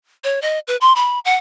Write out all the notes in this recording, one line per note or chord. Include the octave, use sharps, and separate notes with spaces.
C#5
D#5
B4
C6
B5
F#5